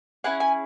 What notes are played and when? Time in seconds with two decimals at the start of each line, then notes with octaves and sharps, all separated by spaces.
0.24 C#4 E4 G#4 F#5
0.40 G#5